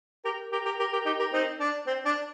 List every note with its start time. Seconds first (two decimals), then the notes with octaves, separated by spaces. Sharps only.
0.25 G4 A#4
0.52 G4 A#4
0.65 G4 A#4
0.79 G4 A#4
0.93 G4 A#4
1.06 D#4 G4
1.19 G4 A#4
1.33 C4 D#4
1.60 D4
1.87 C4
2.05 D4